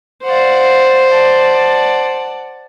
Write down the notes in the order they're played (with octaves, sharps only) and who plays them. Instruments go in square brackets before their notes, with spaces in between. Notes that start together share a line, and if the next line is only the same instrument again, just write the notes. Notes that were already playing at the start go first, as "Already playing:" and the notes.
[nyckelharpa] C5 [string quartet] D5 F5 F#5
[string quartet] D5 F#5 A5